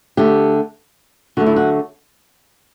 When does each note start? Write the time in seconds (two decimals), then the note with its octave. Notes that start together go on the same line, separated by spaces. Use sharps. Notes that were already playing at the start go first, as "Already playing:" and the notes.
0.17 D3 A3 G4
1.37 D3 F#3 A3 F#4
1.46 E4
1.56 F#4